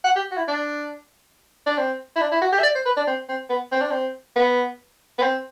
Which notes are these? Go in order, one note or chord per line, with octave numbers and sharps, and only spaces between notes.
F#5
G4
F#4
E4
D4
D4
C4
E4
D4
E4
F#4
G4
E5
D5
C5
B4
D4
C4
C4
B3
C4
D4
C4
B3
B3
C4